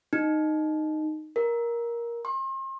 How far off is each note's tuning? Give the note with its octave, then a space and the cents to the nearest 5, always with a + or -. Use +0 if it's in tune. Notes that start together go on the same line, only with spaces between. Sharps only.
D#4 -10
A#4 +15
C6 +40